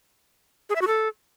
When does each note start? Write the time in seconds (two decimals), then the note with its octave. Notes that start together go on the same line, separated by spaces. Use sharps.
0.70 G#4
0.76 E5
0.81 F#4
0.87 A4